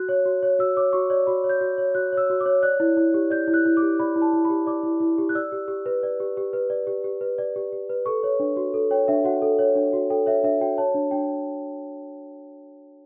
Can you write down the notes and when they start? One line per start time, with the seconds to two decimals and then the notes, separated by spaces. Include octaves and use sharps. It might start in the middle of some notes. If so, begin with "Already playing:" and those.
Already playing: F#4 F#6
0.09 C#5
0.26 F#4
0.43 C#5
0.59 F#4 E6
0.77 C#5 D6
0.93 F#4 C#6
1.10 C#5 D5
1.27 F#4 B5
1.44 C#5
1.49 G6
1.61 F#4
1.78 C#5
1.95 F#4 F#6
2.12 C#5 E6
2.30 F#4
2.41 D6
2.46 C#5
2.63 D5 F#6
2.80 E4
2.97 E4
3.14 G4
3.30 D5 G6
3.47 E4
3.54 F#6
3.66 E4
3.77 D6
3.82 G4
4.00 D5 B5
4.16 E4
4.22 A5
4.33 E4
4.45 B5
4.50 G4
4.67 D5 D6
4.83 E4
5.00 E4
5.18 G4
5.29 F#6
5.35 D5 E6
5.52 G4
5.68 G4
5.86 B4
6.03 D5
6.20 G4
6.37 G4
6.53 B4
6.70 D5
6.87 G4
7.04 G4
7.21 B4
7.38 D5
7.56 G4
7.72 G4
7.89 B4
8.06 A4 C#6
8.23 C#5
8.40 D4
8.57 F#4
8.74 A4
8.91 C#5 G5
9.08 D4 E5
9.24 F#4 F#5
9.42 A4
9.59 C#5
9.76 D4
9.93 F#4
10.10 A4 G5
10.26 C#5 E5
10.44 D4 E5
10.61 F#4 G5
10.78 C#5 A5
10.95 D4
11.11 D4 G5